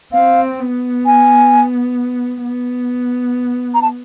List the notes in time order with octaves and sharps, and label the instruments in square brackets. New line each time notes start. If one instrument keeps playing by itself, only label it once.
[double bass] C4 [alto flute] F5
[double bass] B3
[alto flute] G#5
[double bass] B3
[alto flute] A#5
A5